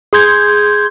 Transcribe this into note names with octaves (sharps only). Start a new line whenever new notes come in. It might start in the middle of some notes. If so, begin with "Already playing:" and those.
G#4 C6 G6 G#6